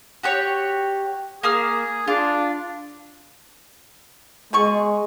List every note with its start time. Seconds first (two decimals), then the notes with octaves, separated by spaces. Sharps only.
0.23 F#4 G4 C#5
1.43 A#3 G#4 D#6 F6
2.08 D4 F4
4.53 B2 G#3 G#4 C#6